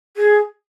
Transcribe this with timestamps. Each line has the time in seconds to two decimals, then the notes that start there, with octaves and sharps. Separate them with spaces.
0.17 G#4